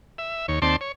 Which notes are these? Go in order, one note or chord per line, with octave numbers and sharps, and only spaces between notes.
E5
D#2 C#5
D#2 C4 D5 A5 C6
C#5